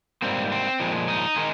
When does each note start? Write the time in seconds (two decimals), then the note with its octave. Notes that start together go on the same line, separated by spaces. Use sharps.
0.22 G#2 G3 A#3 C4
0.52 C4
0.80 A#2 F3 G#3
1.08 D#4
1.36 D#3 G#3